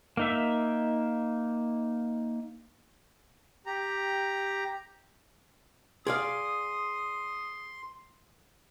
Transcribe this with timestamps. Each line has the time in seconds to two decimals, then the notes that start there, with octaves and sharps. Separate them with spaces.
0.17 A#3 D#4 E5
3.66 G4 A#5
6.07 G#4 D5 F5 C6 D#6